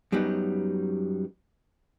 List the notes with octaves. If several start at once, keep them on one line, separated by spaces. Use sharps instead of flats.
F#2 F#3 G3 B3 D#4